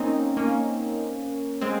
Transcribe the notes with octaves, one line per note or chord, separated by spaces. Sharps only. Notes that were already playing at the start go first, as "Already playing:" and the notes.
Already playing: A#3 C4 C#4 D#4
A#3 C#4
G#3 C4